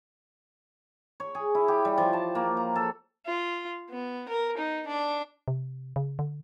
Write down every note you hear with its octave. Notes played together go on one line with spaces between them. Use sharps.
C#5
G#4
E4
G4
G3
F3
A5
A#3
A#5
A4
F4
B3
A#4
D#4
D4
C3
C#3
D3